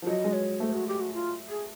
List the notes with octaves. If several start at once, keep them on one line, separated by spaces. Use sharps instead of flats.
F3
F#3 D#5
G#3
C#5
A3 C5
F#4
G4
F#4
F4
G#4